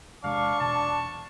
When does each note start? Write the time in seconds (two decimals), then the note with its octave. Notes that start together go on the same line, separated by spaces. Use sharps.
0.24 E2 C3 G#3 D4 F5 C#6
0.60 E2 B2 A5